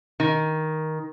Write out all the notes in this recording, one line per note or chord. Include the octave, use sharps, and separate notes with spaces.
D#3